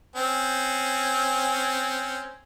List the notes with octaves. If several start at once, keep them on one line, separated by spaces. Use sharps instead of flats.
C4 C#4